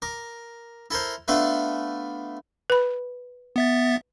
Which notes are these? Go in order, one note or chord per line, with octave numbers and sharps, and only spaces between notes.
A#4 D6
E4 A4 A#4 C5
A3 B3 D4 F4 A4 B4
B4 B5
B3 E5 A6